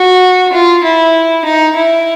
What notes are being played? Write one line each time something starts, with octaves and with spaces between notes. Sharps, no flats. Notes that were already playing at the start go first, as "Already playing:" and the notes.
Already playing: F#4
F4
E4
D#4
E4